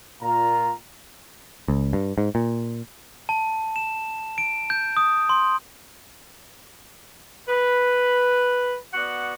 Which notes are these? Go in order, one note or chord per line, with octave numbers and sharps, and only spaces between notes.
A#2 F4 A#5
C#2
G2
G#2
A#2
A5
E7
D7
G6
D#6
C6
B4
B3 F#4 D5 F#5